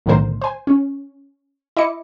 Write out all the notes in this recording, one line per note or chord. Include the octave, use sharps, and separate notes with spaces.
B1 A2 D3 D#3 A#4 C5
C5 G#5
C#4
E4 D#5 D6 C#7